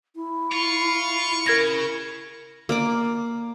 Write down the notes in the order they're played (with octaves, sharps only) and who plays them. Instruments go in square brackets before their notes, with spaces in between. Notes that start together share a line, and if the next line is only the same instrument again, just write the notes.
[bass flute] E4
[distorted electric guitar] F4 [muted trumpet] C#6
[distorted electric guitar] C#3 [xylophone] A#4 G#6 A#6
[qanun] A#3 D5 D6